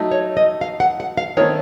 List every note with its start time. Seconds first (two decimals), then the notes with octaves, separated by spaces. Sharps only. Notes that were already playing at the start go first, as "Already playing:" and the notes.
Already playing: F#3 A3 D#4
0.11 C#5
0.37 D#5
0.61 F5
0.80 F#5
1.00 F#5
1.17 F5
1.37 D#3 A3 C4 C#5